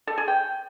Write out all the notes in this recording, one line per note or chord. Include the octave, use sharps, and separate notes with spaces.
A4
G#4
G5